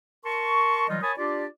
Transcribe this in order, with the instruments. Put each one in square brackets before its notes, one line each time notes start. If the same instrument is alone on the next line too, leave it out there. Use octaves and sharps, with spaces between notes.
[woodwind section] A#4 A5 C6 C#6
E3 F#3 G3 D#4 F4 D#5
A#4 C#5 G#5 A5 B5 D#6
D4 F4 G4 D5